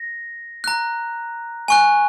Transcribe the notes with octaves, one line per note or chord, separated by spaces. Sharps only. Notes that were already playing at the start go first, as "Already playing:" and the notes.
Already playing: A#6
A#5 F#6
G#5 C#6 F#6